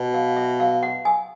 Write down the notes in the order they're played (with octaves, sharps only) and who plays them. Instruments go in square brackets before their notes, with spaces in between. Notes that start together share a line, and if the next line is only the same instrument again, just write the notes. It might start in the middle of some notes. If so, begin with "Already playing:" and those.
Already playing: [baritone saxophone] B2
[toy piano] F5
E5
F5
F#5
G#5